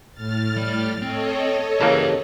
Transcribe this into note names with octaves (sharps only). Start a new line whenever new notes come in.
A2 F6 A6
G3
C4 A4 C#5 D#5
C#3 E3 A#3 G4 A5